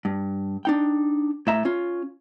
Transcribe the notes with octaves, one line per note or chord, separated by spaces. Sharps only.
G2
D4 D#4 G5
A2 E5 A#5
C#4 F4